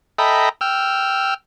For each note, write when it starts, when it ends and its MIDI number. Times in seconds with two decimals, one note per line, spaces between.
0.18 0.49 69
0.18 0.49 75
0.18 0.49 76
0.18 0.49 79
0.18 0.49 82
0.18 0.49 83
0.61 1.34 79
0.61 1.34 88
0.61 1.34 89